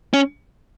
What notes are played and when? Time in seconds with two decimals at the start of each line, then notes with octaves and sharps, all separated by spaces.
0.14 C#4